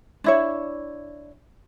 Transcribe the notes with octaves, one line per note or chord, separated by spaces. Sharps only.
D4 E4 C#5